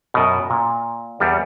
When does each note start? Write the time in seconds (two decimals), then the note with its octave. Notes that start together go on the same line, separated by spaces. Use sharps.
0.14 F#2 B2
0.50 A#2
1.20 E2 G3